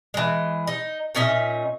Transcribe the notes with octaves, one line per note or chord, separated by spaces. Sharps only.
E3 G#3
D#4
A#2 C#4 D#4 E5